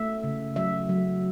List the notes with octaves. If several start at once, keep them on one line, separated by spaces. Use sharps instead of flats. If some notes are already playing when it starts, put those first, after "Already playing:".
Already playing: A3 E5
C#3
F#3 E5
F#3